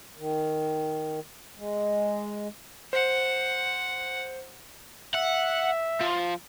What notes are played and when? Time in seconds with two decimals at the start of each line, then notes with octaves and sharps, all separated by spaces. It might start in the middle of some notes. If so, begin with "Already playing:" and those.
0.17 D#3
1.57 G#3
2.93 C5 F#5
5.14 E5 F#5
6.01 F3